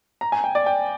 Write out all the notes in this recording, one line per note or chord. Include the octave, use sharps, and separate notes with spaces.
A#5
G#5
G5
D5
G5